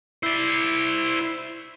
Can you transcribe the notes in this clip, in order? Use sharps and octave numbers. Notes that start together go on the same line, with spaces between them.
E4 C5 D5